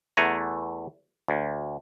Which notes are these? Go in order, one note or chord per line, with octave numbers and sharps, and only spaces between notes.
E2 A3 F#5 G#5 A#5
D2